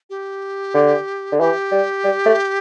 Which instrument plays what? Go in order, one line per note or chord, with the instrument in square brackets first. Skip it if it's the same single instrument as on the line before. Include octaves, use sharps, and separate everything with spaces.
[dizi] G4
[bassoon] D3
D3
[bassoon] E3 [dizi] G4
[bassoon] G3
G3
A3